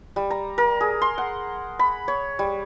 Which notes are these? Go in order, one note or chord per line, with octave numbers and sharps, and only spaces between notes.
G3
A#5
A#4
G#4
C6
F#5
B5
C#5
G3